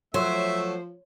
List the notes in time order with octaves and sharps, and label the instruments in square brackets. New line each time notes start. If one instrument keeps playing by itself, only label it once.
[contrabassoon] F3 [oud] F#3 [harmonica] A3 E5 [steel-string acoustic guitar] C5